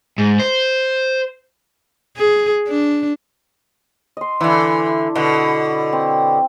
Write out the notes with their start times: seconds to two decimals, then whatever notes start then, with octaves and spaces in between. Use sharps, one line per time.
0.18 G#2
0.39 C5
2.17 G#4
2.68 D4
4.17 D#5 C6
4.40 D3 E3 E4
5.15 B2 D3
5.92 C4